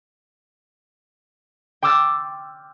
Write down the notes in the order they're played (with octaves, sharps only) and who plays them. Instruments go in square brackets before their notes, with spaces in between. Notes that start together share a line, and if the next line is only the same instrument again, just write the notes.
[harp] G5 C6 D6 E6 F6 A6